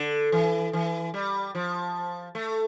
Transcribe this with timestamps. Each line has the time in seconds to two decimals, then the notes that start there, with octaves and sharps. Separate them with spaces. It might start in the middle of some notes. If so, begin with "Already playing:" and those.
Already playing: D3
0.32 E3
0.73 E3
1.14 G3
1.55 F3
2.35 A3